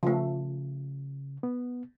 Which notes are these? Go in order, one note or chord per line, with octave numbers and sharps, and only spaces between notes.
C#3 F3 A3
B3